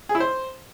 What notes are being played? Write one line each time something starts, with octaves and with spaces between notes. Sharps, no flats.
G#4
E4
C5